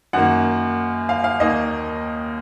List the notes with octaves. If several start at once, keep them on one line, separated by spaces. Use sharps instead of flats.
F#2 D#3 A#3 F#5
F5
F5
D#2 D#3 A#3 D#5